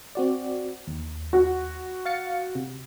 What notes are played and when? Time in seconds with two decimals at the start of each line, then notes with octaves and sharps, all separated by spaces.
0.15 C4 F#4 D5
0.87 D#2
1.33 F#4
2.06 F5 A6 C#7
2.55 C3